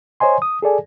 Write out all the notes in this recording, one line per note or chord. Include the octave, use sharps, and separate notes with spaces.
C5 C#5 D#5 G#5 C6
D#6
G#4 A4 D5 G#5